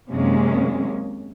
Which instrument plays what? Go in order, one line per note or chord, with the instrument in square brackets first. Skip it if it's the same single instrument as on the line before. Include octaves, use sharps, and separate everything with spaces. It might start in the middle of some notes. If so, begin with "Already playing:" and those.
[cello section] F#2 C3 D#3 G#3 A#3 C#4